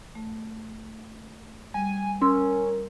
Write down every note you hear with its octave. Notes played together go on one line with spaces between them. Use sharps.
A3
G3 G#5
C#4 A#4 C6 E6